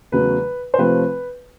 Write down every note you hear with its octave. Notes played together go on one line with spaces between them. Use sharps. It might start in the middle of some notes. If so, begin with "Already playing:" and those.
E2 C#3 F#3 A3 B4
C5
C3 F3 A3 C4 B4